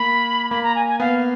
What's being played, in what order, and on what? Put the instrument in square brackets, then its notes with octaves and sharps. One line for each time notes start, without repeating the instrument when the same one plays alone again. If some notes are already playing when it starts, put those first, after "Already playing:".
Already playing: [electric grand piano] A#3 [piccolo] B5
[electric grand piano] A#3 [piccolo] B5
[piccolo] A#5
G#5
G#5
[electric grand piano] B3 [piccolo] F5